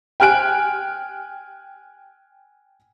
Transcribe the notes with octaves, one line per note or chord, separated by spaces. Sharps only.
G5 G#5 F6 F#6 D7